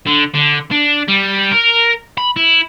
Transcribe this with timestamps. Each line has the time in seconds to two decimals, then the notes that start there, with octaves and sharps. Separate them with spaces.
0.07 D3
0.34 D3
0.71 D4
1.08 G3
1.51 A#4
2.18 B5
2.36 E4